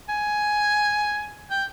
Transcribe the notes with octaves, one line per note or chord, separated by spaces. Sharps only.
G#5
G5